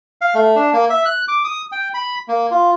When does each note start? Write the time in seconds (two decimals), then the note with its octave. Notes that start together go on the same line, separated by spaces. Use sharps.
0.21 F5
0.35 A3
0.56 D4
0.73 A#3
0.90 E5
1.06 F#6
1.28 D6
1.44 D#6
1.72 G5
1.94 B5
2.28 A#3
2.51 F4